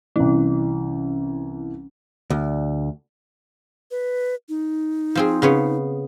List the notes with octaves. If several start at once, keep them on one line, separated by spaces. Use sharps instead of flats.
C2 E3 C#4
D2
B4
D#4
F3 C4 G#4
C#3 B3 C#5